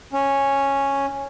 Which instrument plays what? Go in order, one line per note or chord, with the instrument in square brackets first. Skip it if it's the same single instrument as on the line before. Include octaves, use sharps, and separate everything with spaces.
[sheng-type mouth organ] C#4